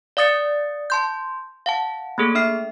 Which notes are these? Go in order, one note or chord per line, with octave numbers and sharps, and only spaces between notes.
D5 F5 D#6 A6 C#7
A5 C6 G6
F5 F#5 A5
A3 A#3 G#4 A4
D4 E5 F6 C7